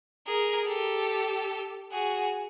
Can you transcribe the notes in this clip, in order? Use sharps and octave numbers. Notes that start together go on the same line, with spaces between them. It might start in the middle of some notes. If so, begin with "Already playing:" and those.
G#4 A#4
G4 A4
F#4 G#4